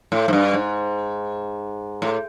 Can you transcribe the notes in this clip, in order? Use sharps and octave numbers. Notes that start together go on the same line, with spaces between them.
A2
G#2
G2
G#2
A2